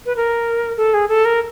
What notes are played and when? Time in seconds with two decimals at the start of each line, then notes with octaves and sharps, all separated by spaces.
0.06 B4
0.16 A#4
0.77 A4
0.94 G#4
1.08 A4
1.25 A#4